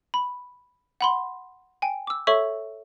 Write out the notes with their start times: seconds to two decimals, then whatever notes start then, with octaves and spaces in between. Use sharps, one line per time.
0.14 B5
1.01 F#5 B5 C6
1.82 G5 G#5
2.07 D6 E6
2.27 A4 C#5 E5 C#6 E6